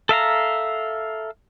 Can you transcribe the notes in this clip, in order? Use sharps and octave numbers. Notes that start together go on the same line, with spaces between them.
A4 E5 F5 A#5